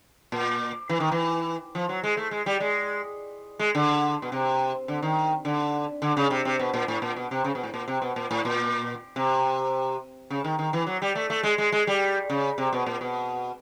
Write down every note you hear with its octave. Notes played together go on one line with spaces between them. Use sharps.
A#2
E3
D#3
E3
F3
F#3
G#3
A3
G#3
G3
G#3
G#3
D3
B2
C3
D3
D#3
D3
D3
C#3
C3
C3
B2
A#2
A2
A#2
B2
C3
C#3
B2
A2
A#2
C3
B2
A#2
A2
A#2
C3
C#3
D#3
D#3
E3
F#3
G3
A3
A3
G#3
G#3
G#3
G3
C#3
C3
B2
A#2
B2